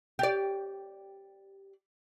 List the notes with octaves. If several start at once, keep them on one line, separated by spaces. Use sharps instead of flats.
G4 D5